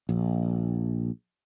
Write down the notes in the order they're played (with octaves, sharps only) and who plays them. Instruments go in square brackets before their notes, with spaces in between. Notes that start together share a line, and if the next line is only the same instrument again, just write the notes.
[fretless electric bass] A#1